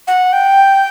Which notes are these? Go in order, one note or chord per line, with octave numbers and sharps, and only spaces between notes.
F#5
G5